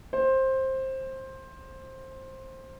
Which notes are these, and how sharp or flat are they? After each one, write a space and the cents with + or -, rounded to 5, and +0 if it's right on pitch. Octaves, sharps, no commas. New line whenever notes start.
C5 +15